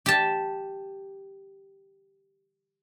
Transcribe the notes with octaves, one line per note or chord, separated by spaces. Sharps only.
G4 A5